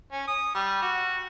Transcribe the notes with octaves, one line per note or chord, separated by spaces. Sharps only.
C#4
D#6
G3
F#4